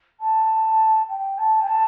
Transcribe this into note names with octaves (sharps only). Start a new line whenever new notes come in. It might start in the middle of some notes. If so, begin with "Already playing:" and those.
A5
G5
A5
G5
A5